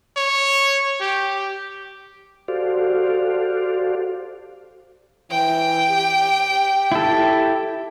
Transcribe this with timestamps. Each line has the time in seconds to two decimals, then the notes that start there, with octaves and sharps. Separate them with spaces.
0.17 C#5
1.01 G4
2.48 F#4 G4 A4 C5 D5 F5
5.31 E3 G5
5.90 G4
6.92 E4 A4